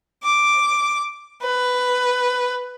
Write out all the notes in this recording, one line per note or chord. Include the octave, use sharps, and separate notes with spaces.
D6
B4